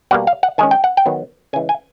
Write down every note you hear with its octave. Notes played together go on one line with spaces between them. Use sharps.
B2 G3 A#3 F#5
F5
F#5
D#3 G#3 C#4 G#5
G5
F#5
G5
D#3 F#3 B3
C#3 E3 G#3 G#5
G#5